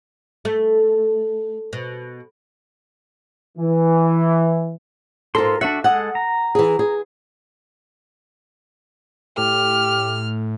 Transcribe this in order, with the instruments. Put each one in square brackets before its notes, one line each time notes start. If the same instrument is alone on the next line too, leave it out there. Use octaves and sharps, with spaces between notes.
[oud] A3
B2
[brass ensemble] E3
[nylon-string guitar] G#2 A4 [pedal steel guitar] F4 A#4 C6
[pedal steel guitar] D4 F#4 F#5 [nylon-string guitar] E5
[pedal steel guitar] G#3 A4 D#6 [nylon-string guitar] F#5
[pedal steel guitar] A#5
[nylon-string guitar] E3 G#4
G#4
[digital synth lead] A2 [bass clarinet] G4 [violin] F6